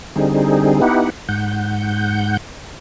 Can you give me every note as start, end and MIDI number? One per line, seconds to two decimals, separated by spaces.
0.16 0.81 50
0.16 0.81 55
0.16 0.81 60
0.16 0.81 63
0.16 0.81 68
0.82 1.10 59
0.82 1.10 63
0.82 1.10 64
0.82 1.10 67
0.82 1.10 78
1.29 2.37 44
1.29 2.37 78
1.29 2.37 91